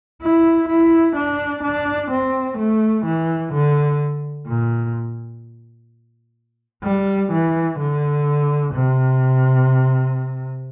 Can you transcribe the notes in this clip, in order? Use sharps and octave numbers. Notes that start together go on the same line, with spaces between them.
E4
E4
D4
D4
C4
A3
E3
D3
A#2
G3
E3
D3
C3